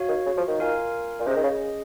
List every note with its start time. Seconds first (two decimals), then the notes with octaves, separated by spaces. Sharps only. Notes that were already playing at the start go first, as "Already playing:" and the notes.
Already playing: F#4 C#5 F5
0.09 D#3
0.26 C#3
0.37 F3
0.48 D#3
0.59 F4 A#4 F5 G#5
1.20 A#2
1.27 C3 C#4 G#4 D#5
1.36 D#3
1.43 C#3